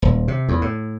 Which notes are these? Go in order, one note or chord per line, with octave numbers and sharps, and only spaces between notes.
D#1
C3
E2
A2